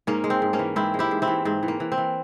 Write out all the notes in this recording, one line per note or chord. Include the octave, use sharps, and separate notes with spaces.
G#2 A#3 C#4
G#3
C4
G#2
A#3 C#4
E3
G#2 C4 E4
G#3
E4 G4
G#2
C4 E4
E3
G#2 C4
E3
A#3
E3
C4
E3